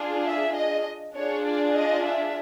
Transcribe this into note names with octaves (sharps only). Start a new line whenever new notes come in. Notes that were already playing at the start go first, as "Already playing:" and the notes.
Already playing: D4 F4 G#4
E5
D#5
D4 F4 G#4 C#5
D5
D#5
E5